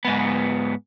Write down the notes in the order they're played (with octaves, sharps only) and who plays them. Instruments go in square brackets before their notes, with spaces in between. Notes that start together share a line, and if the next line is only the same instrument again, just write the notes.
[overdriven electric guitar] G#2 B3